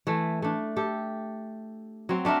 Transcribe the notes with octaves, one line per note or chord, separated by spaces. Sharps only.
E3 A3
A3 D4
G4 A4
F#3 C4
A3 D4 A#4 E5